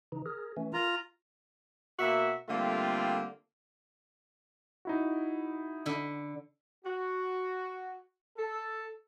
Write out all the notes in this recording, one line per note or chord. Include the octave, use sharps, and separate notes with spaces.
C#3 E3 D#4
G#4 A#4
E3 A3 C#4
F4 A#4 A#5
B2 A#3 F#4 E5
D3 G3 A3 A#3 C4 F4
D#4 E4 F#4
D3 B5
F#4
A4